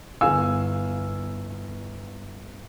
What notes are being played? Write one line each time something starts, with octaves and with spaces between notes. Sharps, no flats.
G1 B3 E4 F5 G#5 E6